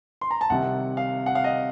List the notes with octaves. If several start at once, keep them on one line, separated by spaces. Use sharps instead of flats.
C6
A#5
A5
C2 C3 D#3 F#5
F5
F#5
F5
D#5